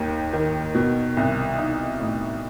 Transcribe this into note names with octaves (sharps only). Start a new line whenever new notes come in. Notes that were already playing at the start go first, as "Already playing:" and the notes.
Already playing: D#2 D#3
D#3
B2
C2
D#4
A2